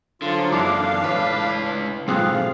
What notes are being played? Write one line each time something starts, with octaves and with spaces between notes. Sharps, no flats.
D3 F3 F#3 F4
F#2 E3 D4 E4 A4 F5 D6
C#2 A2 B4
B1 G#2 C4 F4 G#4 A4 F5 F#6